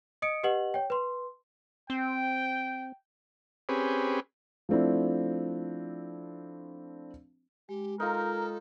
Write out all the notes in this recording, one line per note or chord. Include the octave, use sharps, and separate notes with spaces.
D#5 D#6 C#7 D7
G4 B4 D#5 F#5 F#7
C#5 G5
B4 C6
C4 G5
C4 C#4 G4 G#4 B4
F3 A3 C4 D4 E4
G#3 G4
D#4 F4 A4 A#4